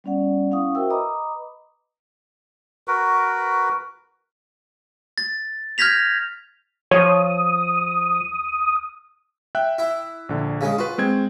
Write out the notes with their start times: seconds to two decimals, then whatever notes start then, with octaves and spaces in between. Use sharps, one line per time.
0.04 G3 B3 C#4 D5 F#5
0.51 C#4 E4 F5 F#5 C#6 D#6
0.75 F#4 A#4 C5 E5 G5 E6
0.90 B4 D#5 A#5 B5 D6 D#6
2.88 F#4 A#4 B4
5.18 A6
5.78 F6 G6 G#6 A#6 B6 F7
6.91 F3 C#5 D#6
9.55 E5 G5 F#6
9.78 E4
10.29 A#1 D3
10.61 C#3 G#3
10.78 F4 F#4 B4
10.98 G#3 C4 G#6